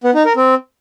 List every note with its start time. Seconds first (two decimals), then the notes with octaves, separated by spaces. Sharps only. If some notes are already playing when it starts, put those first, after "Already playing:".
0.04 B3
0.15 D#4
0.25 A#4
0.36 C4